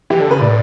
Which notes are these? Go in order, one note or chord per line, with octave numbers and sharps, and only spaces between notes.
E3 G4
D3 A4
C#3 B4
A2 D5